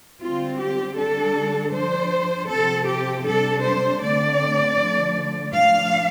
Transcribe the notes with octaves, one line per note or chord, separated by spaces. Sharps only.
D3 G3 C4 F4
G4
D3 G3 D4 A4
F3 D4 C5
C3 F3 C4 A4
G4
C3 G3 D4 A4
C5
D3 A3 C4 D5
D3 F3 A3
A2 F3 D4 F5